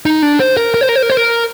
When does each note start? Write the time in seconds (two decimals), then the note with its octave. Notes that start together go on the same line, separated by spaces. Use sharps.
0.06 D#4
0.22 D4
0.40 C5
0.57 A#4
0.74 A#4
0.81 C5
0.89 A#4
0.96 C5
1.03 A#4
1.10 C5
1.17 A#4